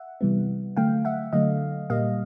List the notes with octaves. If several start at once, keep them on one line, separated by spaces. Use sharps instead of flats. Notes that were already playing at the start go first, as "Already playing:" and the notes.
Already playing: E5 F#5
C3 E3 G3 B3
D3 F#3 A3 F5 G5
E5 F#5
D3 F#3 A3 D#5 F5
A#2 G3 A#3 D#5 F5